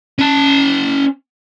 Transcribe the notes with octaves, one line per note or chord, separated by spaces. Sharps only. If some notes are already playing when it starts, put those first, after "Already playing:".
C#4 A5